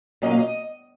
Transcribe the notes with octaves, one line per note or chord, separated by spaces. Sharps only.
A#2 F#3 A#3 C#4 D#5
F5
D#5